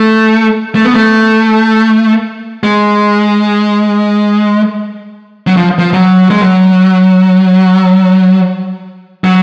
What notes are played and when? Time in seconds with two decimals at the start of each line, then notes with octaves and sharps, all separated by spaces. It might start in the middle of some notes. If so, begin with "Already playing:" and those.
Already playing: A3
0.75 A3
0.85 B3
0.94 A3
2.63 G#3
5.47 F#3
5.57 F3
5.78 F3
5.94 F#3
6.30 G#3
6.41 F#3
9.24 F#3